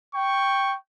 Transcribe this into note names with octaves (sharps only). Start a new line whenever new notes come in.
G5 C#6